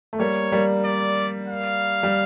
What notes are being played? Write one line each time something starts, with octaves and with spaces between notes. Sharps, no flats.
A3
G3 A#3 C#5
G3 A#3
D5
F5
G3